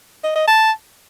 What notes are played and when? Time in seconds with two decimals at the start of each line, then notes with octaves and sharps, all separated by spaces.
0.24 D#5
0.35 D#5
0.47 A5